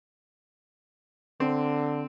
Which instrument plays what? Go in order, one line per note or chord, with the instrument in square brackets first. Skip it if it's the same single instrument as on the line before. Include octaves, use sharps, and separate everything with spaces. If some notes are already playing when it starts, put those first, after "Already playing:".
[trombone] D3 [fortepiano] C4